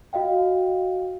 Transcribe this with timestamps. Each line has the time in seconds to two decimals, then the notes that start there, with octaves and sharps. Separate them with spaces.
0.13 F#4 D#5 F5 G5